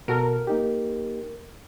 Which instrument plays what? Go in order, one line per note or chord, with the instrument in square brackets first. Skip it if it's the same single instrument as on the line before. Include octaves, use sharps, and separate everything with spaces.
[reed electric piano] B2 F#4 A4 [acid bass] A#4
[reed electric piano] A#3 D#4 G4